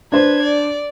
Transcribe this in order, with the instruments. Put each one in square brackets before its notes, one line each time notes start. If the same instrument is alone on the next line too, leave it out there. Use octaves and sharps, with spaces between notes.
[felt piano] D4 C5 [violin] B4 G#6
[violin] D5